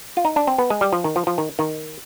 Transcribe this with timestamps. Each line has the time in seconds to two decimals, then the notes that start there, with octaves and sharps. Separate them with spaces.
0.17 F4
0.25 D#4
0.36 D4
0.47 C4
0.58 B3
0.70 G#3
0.81 G3
0.93 F3
1.04 D#3
1.16 F3
1.27 F3
1.38 D#3
1.59 D#3